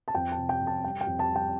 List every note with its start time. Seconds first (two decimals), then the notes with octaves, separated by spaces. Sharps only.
0.08 A5
0.14 F2 G5
0.32 A5
0.38 C3
0.49 G5
0.61 F2
0.67 A5
0.84 G3 G5
1.01 G5
1.07 F2
1.19 A5
1.31 G3 G5